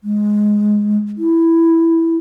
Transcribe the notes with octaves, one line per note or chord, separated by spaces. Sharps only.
G#3
E4